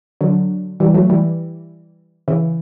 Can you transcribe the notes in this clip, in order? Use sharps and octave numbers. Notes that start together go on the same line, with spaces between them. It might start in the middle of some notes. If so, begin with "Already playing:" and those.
D3 F#3
E3 G3
F#3 A3
E3 G3
C#3 E3